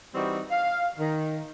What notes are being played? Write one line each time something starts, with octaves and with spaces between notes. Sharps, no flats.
E3 G3 C4 D#4 F#4
F5
D#3